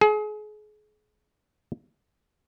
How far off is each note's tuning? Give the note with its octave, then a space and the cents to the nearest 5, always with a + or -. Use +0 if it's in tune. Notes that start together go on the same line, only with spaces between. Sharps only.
G#4 +35